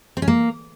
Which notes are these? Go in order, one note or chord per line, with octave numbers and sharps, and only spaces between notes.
C4
C#4
A#3